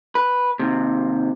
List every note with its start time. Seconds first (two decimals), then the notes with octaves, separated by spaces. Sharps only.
0.15 B4
0.59 D#2 C3